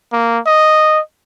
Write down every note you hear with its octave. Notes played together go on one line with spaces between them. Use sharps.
A#3
D#5